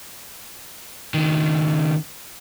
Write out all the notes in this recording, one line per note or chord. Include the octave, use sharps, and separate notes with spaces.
C#2 D#3